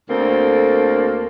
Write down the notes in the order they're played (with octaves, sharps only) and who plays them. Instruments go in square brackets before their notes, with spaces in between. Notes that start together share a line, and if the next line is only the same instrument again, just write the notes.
[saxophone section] D2 A#3 C4 A4